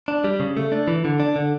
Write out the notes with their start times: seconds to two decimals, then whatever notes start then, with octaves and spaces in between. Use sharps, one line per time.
0.08 D4
0.24 G3
0.40 C#3
0.57 A3
0.72 D4
0.88 E3
1.05 D3
1.20 D4
1.36 D3